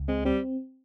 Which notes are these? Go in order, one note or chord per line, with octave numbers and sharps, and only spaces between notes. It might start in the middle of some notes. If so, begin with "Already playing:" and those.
Already playing: C#2
G#3 C4
G3 C4